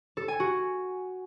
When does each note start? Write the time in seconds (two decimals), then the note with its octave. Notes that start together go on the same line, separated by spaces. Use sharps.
0.17 A4
0.28 G#5
0.40 F#4